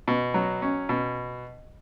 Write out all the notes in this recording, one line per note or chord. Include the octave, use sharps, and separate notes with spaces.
B2
F#3
C#4
B2